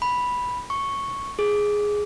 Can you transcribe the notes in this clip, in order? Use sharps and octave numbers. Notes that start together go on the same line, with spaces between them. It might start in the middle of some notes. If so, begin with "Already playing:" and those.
B5
C#6
G#4